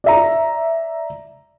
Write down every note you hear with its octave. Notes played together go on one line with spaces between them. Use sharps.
D5 E5 A#5